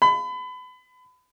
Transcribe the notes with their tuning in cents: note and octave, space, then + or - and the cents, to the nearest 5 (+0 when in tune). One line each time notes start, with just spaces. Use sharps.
B5 +30